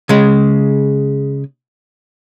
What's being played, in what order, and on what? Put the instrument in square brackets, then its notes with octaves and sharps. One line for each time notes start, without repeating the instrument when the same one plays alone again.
[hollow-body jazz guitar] C#3 G#3